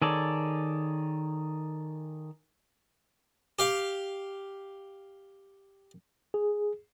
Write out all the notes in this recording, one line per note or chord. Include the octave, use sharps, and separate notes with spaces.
D#3 G#4 A4 C#5 D5
G4 F5
G#4